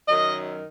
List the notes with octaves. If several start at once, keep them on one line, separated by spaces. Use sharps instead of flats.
F#2 D#3 F#3 D#5